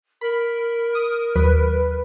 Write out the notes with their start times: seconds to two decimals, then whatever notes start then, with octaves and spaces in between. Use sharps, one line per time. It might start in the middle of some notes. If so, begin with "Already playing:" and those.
0.21 A#4 B5
0.95 D#6
1.36 D#2 F#3 B4